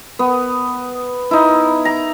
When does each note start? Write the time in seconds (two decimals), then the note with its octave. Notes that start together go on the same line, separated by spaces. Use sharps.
0.19 B3
1.31 D#4 E4
1.85 A#5